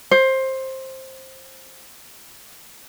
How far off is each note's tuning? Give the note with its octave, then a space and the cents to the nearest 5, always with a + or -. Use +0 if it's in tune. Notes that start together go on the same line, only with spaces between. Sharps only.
C5 +15